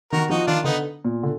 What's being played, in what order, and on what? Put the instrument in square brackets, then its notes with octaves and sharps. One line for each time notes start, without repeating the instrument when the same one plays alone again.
[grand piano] D#3 [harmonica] F#4 A#4
[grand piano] F3 [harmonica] D#4 F#4
[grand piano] D#3 [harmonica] D4 F4
[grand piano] D3 [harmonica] B3 D#4
[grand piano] A#2
D3